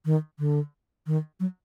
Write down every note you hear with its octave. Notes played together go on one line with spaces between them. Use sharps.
D#3
D3
D#3
F#3